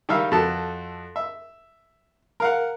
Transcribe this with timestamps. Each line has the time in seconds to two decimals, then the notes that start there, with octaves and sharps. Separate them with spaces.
0.09 D#3 G3 E5 F5
0.31 F2 F#4 A4 A5
1.16 E5
2.40 A#4 F5 F#5